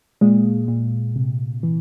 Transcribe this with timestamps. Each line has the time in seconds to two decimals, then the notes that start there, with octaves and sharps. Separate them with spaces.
0.21 A#2 G#3
0.68 A#2
1.16 C3
1.63 E3